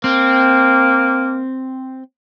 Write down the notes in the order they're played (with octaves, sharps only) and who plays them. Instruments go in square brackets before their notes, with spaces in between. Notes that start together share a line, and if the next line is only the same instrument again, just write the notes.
[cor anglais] A#3 [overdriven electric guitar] C4